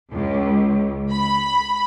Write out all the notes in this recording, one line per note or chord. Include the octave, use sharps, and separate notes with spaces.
C#2
B5